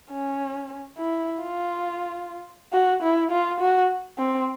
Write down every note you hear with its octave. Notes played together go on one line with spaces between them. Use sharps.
C#4
E4
F4
F#4
E4
F4
F#4
C4